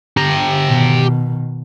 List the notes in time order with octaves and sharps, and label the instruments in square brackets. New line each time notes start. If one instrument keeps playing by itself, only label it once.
[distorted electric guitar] G4 A#5
[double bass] B2 D#3